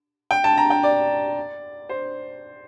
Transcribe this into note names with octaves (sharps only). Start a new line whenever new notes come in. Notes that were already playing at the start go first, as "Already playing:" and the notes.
G5
A5
A#5
G5
D5
C5